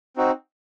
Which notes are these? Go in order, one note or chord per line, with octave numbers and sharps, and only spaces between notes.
C4 D#4 F#4